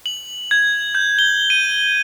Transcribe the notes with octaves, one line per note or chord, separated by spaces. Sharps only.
F#7
G#6
G6
G7
D#7